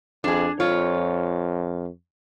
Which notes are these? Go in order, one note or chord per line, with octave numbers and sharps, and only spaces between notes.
F2 D4 G#4
F2 F4 C#5